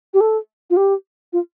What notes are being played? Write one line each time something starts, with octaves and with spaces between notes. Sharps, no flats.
G4
A4
F4
G4
F4